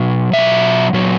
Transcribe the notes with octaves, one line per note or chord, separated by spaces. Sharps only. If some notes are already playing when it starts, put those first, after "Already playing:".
Already playing: B2 F#3
B2 F#3 E5
A#2 F#3